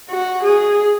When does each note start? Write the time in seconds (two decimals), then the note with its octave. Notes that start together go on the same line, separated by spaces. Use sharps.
0.10 F#4
0.44 G#4